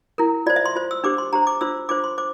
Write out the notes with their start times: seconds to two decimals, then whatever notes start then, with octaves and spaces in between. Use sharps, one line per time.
0.18 E4 A#4
0.46 F4 D5
0.50 C5
0.56 E5
0.66 C6
0.76 F4 C5
0.91 E6
1.04 D4 G4 C5 D6
1.18 C6
1.33 D4 G4 C5 A#5
1.47 D6
1.61 D4 F4 C5 E6
1.89 D4 F4 C5 D6
2.04 C6
2.18 C5 D6